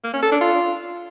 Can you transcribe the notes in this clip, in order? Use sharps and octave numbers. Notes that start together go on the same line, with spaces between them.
A#3
C#4
A4
D4
F4